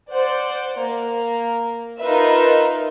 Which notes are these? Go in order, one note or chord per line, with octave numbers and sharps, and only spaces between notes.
C5 D5 F#5
A#3
D#4 F4 A#4 B4 E5